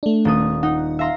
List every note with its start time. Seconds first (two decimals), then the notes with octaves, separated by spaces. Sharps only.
0.03 A3 D4
0.25 D#1 A4 D#6
0.63 D#4 F#5
0.99 E5 F5 A#5 C6 E6